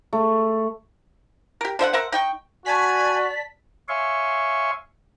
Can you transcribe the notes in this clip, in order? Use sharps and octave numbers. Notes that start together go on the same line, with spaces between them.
A3
G4 A#4
D3 C5 E5 F#5
A#4 C5 E5 F#5
D#4 G5 C#6
F#4 D5 G#5 A5 B6
C#5 E5 F5 G#5 C6 C#6